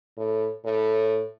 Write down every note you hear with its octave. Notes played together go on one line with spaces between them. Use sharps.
A2
A2